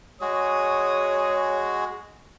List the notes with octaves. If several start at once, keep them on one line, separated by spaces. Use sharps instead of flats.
G#3 F#4 G#4 C#5 D#6